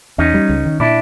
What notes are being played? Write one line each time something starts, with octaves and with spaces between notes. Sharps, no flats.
E2 C#4 D#4
G3
C#2
D#3
A#2 D4 E4